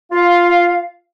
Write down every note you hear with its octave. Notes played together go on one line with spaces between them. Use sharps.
F4 F5